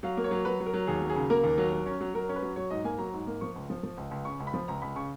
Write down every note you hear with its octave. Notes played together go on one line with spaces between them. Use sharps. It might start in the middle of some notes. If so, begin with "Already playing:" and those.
F#3 F5
A#3
C#5
F#3
F#3 B4
F#3
A#4
F#3
D#2 G#4
F#3
G#4
C#3
A#3 A#4
D#2
F#3
F#3
C#4
F#3
F#3 A#4
C#4
B4
F#3
F#3 C#5
G#2 D#5
A#3 G#5
F#3 A#5
G#2
A#3
F3 C#6
C#2
F3
F3
C#2
C#2
C#3 C#6
C#2
B5
F3
C#2 A#5
C#2 B5
C#3 C#6